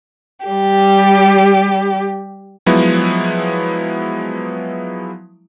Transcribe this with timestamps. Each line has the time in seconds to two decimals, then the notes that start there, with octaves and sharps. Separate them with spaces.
0.47 G3 G4
2.66 F3 F#3 G#3 B3 E4